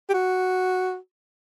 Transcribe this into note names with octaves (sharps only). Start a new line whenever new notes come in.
G4
F#4